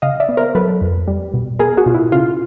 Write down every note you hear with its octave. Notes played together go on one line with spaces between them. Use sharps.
C#3 D#5 F5
D5 E5
B3
A#4 C5
F#3 A4 B4
F2
G3
B2
B3 G#4 A#4
F#4 G#4
B2 F4
E4
C#3 F4